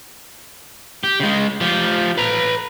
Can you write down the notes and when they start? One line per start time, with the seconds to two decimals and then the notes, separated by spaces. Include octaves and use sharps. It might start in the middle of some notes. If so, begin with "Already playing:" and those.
1.04 G4
1.20 C#3 G#3
1.61 F3 G4
2.17 B4 A#5